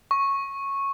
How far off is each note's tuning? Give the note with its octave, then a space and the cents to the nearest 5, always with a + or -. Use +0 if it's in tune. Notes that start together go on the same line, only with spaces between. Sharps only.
C#6 -10